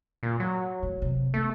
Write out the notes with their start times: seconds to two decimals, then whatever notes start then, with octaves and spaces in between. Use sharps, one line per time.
0.23 A#2
0.40 F#3
0.83 A2
1.02 C3
1.34 A3 B3